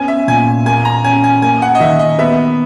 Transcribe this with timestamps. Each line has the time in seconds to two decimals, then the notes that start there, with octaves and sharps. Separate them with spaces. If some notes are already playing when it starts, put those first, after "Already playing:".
Already playing: B3 C#4 G#5
0.08 E5
0.27 A#2 G#5
0.66 A#3 G#5
0.85 A#5
1.04 C#4 G#5
1.24 G#5
1.42 A#3 G#5
1.62 F#5
1.75 D#5
1.80 D#3 E5
1.99 D#5
2.19 B3 E5